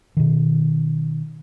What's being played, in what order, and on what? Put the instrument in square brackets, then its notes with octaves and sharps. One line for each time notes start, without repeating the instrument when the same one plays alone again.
[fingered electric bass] B2 D#3